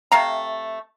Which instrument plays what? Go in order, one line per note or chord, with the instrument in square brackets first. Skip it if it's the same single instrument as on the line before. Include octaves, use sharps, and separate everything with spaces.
[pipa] C3 A3 F5 A#5